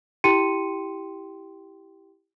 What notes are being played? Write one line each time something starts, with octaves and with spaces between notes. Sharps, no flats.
E4 G4 G5 C6 C#7 D#7